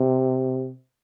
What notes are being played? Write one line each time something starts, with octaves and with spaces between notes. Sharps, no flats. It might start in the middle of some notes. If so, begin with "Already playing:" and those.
Already playing: C3